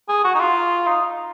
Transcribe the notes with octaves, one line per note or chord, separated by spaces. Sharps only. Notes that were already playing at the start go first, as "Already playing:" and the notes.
G#4
F#4
D#4
F4
D#4